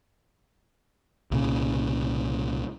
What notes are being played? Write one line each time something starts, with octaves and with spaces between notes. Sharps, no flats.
C2 A#2 C#3